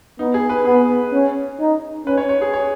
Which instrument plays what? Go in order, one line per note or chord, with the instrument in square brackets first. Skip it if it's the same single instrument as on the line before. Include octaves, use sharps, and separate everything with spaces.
[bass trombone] B3 [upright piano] D#4
[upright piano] G#4
B4
[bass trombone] B3 [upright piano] G#4
[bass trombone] C#4
D#4
[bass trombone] C#4 [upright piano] B4
[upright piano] C#5
C#5
G#4
C#5